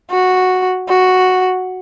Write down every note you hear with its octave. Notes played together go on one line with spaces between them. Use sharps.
F#4
F#4